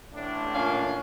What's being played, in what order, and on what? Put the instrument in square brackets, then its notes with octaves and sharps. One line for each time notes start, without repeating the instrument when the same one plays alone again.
[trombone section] A1 A2 D4
[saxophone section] A#2 C#4 F5